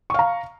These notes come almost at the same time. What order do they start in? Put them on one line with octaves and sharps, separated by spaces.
C#6 F5 A#5